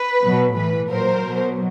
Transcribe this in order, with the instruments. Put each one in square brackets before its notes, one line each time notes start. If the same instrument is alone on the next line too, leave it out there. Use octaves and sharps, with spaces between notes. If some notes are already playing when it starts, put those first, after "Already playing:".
Already playing: [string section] B4
B2 F#3
A2 E3 B4
A#2 F#3 A#4 C5
B2 F#3